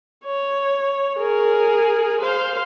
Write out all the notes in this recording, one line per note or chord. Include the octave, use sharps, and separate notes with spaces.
C#5
G#4 A#4
C5 F5